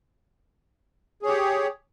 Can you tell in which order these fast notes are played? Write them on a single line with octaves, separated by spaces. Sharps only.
G#4 C#5 G4